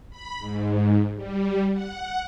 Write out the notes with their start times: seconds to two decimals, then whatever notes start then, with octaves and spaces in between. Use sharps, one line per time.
0.10 B5
0.39 G#2
1.15 G3
1.72 F#5